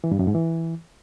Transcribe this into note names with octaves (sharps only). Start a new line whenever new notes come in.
E3
G2
F#2
G#2
E3